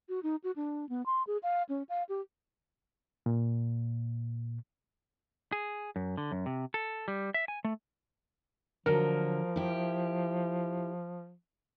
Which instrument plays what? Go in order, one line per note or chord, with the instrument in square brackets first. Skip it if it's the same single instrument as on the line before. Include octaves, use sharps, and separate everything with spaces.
[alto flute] F#4
D#4
F#4
D4
B3
C6
G#4
F5
C#4
F5
G4
[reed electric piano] A#2
[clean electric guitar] G#4
F#2
D3
F#2
C3
A4
G3
E5
G#5
A3
[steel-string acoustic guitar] D3 F#3 [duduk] F3 [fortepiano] A#4
[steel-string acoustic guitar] E4 G4